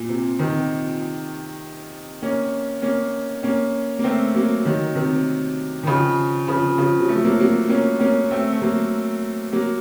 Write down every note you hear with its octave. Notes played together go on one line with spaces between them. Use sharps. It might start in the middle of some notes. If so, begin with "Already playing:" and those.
Already playing: A#2
C3
C3 D#3
A#3 C#4
A#3 C#4
A#3 C#4
A#3
A3 C4
F#3 A#3
D#3 F#3
C3 D#3
D#3
C#3 F3
C#3 F3
C#3 F3
F#3
F3 A3
F#3 A#3
F#3 A#3
A#3 C#4
A#3 C#4
A3 C4
A3
F#3 A#3
F#3 A#3